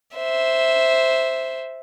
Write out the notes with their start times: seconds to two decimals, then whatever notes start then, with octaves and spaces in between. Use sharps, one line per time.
0.16 C5 E5